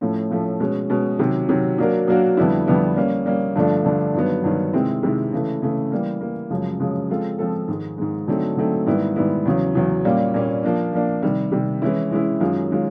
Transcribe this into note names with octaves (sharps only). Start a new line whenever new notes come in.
A2 F3 A3 C#4
A2 F3 A3 C#4
B2 G#3 C#4
B2 G#3 C#4
C3 D#3 F#3
C3 D#3 F#3
F#3 A#3 D4 F#4 A#4
F#3 A#3 D4 F#4 A#4
F2 D3 G3 B3 E4
F2 D3 G3 B3 E4
G3 A#3 C#4
G3 A#3 C#4
G2 D3 F3 A3 D4
G2 D3 F3 A3 D4
G2 D#3 F#3 B3
G2 D#3 F#3 B3
C3 D#3 G#3 C4 E4
C3 D#3 G#3 C4 E4
C#3 E3 A3
C#3 E3 A3
E3 G3 A#3
E3 G3 A#3
F#2 C#3 F3 G#3
F#2 C#3 F3 G#3
F3 G#3 C4 F4 A4
F3 G#3 C4 F4 A4
G#2 D#3 G#3
G#2 D#3 G#3
D3 F#3 A3 C4 D#4
D3 F#3 A3 C4 D#4
G#2 D#3 G3 B3 E4
G#2 D#3 G3 B3 E4
E2 C#3 F#3
E2 C#3 F#3
A#2 G3 A#3 C#4
A#2 G3 A#3 C#4
F3 A#3 D4
F3 A#3 D4
C3 D#3 G3
C3 D#3 G3
E3 G#3 C#4 E4
E3 G#3 C#4 E4
F#2 D#3 G#3 C#4 F4
D#3 G#3 C#4 F4